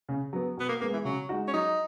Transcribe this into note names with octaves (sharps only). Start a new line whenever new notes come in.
C#3
F#3 B3
B2 B3
A#3
G#3 A#3 B3
E3
C#3 F#3
G#3 D#4 F#4
C#4
F#3 D#4